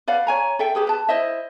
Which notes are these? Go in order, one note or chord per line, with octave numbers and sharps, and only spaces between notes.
B4 D5 F5 F#5
C#5 G#5 A#5
A4 E5 G5
G4 G#4 B4
B4 A5
E4 C5 D#5 E5